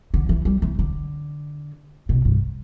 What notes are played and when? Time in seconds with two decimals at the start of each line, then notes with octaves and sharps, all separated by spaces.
0.14 D3
0.29 E3
0.45 G3
0.62 E3
0.79 D3
2.09 B2
2.25 G2